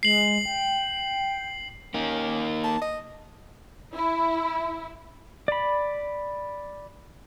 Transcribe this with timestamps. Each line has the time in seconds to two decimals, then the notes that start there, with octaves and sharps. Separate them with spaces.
0.03 G#3 C7 F#7
0.45 G5
1.94 A#3 C#4 D#4
2.64 A5
2.81 D#5
3.95 E4 B5
5.48 D5 B5